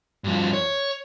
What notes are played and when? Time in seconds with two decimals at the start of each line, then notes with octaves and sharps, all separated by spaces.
0.24 G2 F3
0.53 C#5